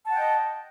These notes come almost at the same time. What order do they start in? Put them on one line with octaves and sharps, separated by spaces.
A5 F#5 G5 D#5